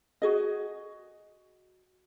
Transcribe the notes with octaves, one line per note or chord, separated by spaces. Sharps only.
F#4 G#4 D#5